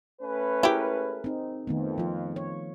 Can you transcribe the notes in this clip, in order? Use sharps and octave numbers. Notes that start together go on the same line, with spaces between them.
A3 C#4 B4
E4 G4 G#4 A#4
C4 D#4
F2 D#3 A3 B3
F3 F4
C#5